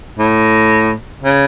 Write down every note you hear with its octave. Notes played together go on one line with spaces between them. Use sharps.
A2
C#3